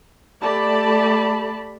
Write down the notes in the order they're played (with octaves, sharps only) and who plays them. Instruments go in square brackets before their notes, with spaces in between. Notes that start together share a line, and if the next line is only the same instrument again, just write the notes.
[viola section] A3 G4 D5 A5 B5